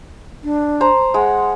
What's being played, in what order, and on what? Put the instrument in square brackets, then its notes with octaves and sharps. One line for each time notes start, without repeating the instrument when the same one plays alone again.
[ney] D4
[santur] C5 A#5
[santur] G#3 [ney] F#5